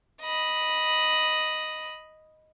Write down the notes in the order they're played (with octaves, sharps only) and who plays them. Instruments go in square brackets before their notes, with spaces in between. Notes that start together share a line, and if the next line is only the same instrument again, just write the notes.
[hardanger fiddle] D#5 B5